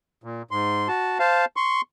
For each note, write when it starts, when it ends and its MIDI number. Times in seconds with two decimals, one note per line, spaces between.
0.24 0.42 46
0.51 0.88 44
0.51 0.88 84
0.88 1.19 66
0.88 1.19 81
1.19 1.45 72
1.19 1.45 77
1.19 1.45 81
1.56 1.81 84
1.56 1.81 85